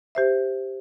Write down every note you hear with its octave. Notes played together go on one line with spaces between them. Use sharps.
G4 C5 E5